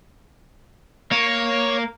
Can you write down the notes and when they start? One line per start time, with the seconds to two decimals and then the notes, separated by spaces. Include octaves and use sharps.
1.11 A#3 C#5